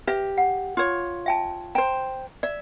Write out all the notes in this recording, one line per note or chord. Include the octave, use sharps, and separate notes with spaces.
G4 B4 E5
F#5
F4 C#5
E5 G5 A5
C5 G5 A#5
D5 E5